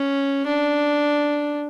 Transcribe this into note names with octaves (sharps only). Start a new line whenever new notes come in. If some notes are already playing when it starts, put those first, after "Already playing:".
Already playing: C#4
D4